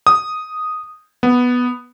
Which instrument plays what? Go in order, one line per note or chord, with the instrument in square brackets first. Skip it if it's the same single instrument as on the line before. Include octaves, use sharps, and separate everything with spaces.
[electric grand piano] D#6
B3